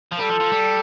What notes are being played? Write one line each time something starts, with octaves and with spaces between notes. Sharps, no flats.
F3
G3 A4
F3
F3
G3